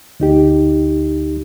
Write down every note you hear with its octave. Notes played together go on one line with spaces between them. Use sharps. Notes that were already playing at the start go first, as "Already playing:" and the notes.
D2 D#4 G4